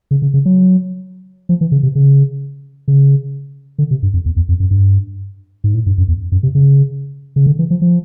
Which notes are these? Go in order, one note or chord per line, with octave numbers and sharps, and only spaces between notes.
C#3
C#3
C#3
F#3
F3
E3
C#3
C3
C#3
C#3
D3
C3
G2
F2
E2
E2
F2
F#2
G2
G#2
A2
G2
F#2
E2
F#2
C3
C#3
C#3
D3
E3
F3
F3